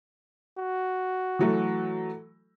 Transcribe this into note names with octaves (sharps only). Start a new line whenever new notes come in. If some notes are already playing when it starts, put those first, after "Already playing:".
F#4
E3 F#3 A3